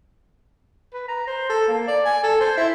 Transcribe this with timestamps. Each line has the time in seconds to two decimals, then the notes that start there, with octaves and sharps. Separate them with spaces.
0.93 B4
1.09 A#5
1.27 C5
1.49 A4
1.68 A#3
1.87 D5
2.05 G#5
2.23 A4
2.40 C5
2.57 E4